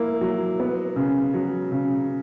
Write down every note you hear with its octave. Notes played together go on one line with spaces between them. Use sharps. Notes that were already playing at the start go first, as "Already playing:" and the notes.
Already playing: A#3 E4
F#3
B3
C#3
F#3
C#3